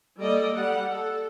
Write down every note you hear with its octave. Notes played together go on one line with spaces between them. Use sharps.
G3 A#3 A4 D5 D#5
G3 F#5
A4